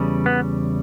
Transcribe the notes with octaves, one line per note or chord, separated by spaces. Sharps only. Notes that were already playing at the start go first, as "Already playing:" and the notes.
Already playing: E2 C#3 G3
B3